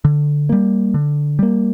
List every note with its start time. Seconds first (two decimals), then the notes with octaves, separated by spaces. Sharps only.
0.05 D3
0.49 G3 A#3
0.94 D3
1.39 G3 A#3